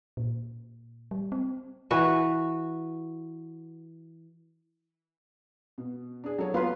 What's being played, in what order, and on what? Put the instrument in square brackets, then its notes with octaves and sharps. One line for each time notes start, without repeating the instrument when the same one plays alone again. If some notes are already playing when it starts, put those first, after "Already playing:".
[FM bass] A#2
G3
C4
[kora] E3 F#4 B4
[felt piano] B2
D4 G#4
F#3 A4 C#5
[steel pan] B3 F4 B4 [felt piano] F5 C6